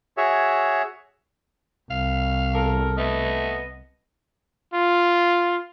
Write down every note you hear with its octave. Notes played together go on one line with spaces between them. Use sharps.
F#4 G#4 C#5 E5
C2 F5
E2 A4 A#4
A3 B3 D#5
F4